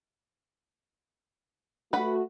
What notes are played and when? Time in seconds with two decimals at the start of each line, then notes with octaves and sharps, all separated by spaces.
1.93 A3 F#4 B4 F#5 B5